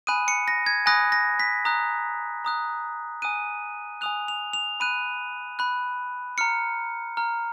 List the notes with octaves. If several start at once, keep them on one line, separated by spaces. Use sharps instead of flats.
G#5 B5 D#6 F#6 D#7
C#7
A#6
G#6
G#5 B5 D#6 F#6 A#6
A#6
B6
A#5 D#6 F#6
A#5 D#6 F#6
G#5 D#6 F#6 D#7
G#5 D#6 F#6 F7
F7
F7
B5 F#6 D#7
B5 F#6
A#5 F6 C#7
A#5 F6